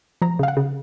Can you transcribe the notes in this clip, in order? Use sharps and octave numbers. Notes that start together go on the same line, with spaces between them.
F3 A#5
C#3 F5
F#5
C#3